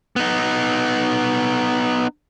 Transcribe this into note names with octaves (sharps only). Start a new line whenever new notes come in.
B3 D#4